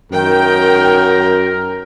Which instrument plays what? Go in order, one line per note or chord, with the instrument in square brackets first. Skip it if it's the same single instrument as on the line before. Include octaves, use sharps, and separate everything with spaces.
[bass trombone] F#2 [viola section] D#3 G5 [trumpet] A#4